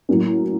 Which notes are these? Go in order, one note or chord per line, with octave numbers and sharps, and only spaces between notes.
A2 F#3 A#3 C#4